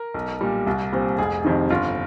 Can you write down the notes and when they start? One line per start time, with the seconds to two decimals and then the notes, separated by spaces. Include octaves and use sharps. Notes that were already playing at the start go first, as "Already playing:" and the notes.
Already playing: A#4
0.14 B1
0.41 A#2 G3
0.67 C2
0.93 A#2 G3 C4
1.18 F1 G#4
1.45 F2 C3 D#3
1.70 G1 F4